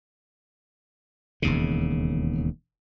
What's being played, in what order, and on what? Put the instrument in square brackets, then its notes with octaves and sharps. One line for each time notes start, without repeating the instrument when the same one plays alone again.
[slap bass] E1 D#2 C#3